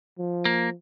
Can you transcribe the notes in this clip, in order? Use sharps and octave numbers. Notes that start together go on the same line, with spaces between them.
F3
A#3